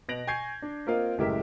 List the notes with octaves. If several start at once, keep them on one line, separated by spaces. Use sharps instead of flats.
B2 B4 A#6 D7 F7 F#7
G#5 C#6 G6 G#6 C7
D4
A#3 C4 F4 A#4 D#5 F5
F#1 A2 G#3 G4 A#4 E5